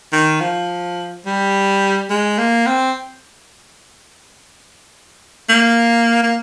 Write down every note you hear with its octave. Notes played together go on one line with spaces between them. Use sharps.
D#3
F3
G3
G#3
A#3
C4
A#3
A#3